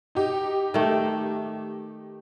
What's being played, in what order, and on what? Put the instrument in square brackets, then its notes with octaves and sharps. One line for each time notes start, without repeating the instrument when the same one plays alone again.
[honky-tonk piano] D#4 G4
[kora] D#3 A3